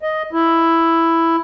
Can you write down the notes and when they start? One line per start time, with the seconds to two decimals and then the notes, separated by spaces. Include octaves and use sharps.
0.02 D#5
0.33 E4